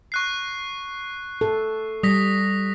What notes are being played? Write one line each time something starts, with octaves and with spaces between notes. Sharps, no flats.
C#6 F#6 C7
A4
G3 D#6 A#6 B6